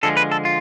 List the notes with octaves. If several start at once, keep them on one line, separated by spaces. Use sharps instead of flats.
D3 F3 G#3 A4
B4
A4
F4